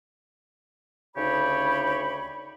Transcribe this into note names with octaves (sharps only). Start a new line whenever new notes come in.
D2 C#3 D#4 G4 C#5 B5